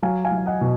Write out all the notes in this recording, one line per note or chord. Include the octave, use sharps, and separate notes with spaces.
F#3 F5 G#5
F5 G#5
F#3
F5
D#5 F#5
B2